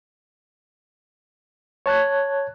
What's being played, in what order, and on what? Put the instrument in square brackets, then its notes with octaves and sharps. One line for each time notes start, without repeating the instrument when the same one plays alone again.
[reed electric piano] C#5 A5 F#6 G#6